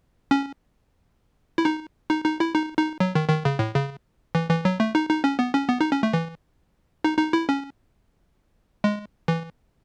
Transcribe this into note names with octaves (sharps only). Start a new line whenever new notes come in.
C#4
E4
D#4
D#4
D#4
E4
D#4
D#4
F#3
D#3
D#3
C#3
A2
C#3
E3
E3
F#3
A3
D#4
D#4
C#4
B3
C#4
B3
D#4
C#4
A3
E3
D#4
D#4
E4
C#4
G#3
E3